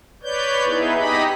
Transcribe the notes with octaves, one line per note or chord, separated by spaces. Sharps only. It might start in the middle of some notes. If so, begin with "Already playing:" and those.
B4 C#5 D5 G6
B3 D#4 E4 G#4 B4
D#4 G4 D#5 B5